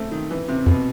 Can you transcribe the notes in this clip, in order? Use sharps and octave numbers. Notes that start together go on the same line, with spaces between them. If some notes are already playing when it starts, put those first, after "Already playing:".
Already playing: A3 C4
D#3
E3
C3
F2 B2